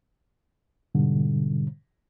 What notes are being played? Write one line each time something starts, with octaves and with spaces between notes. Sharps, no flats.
G#2 B2 D3 G3